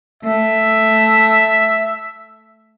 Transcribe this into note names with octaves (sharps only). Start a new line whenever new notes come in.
A3 E5